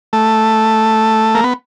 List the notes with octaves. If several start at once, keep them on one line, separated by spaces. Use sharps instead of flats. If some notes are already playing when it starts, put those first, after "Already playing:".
A3
A#3
B3